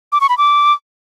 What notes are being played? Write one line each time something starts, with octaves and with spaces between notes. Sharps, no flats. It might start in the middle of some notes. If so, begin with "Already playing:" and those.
D6
C#6
B5
D6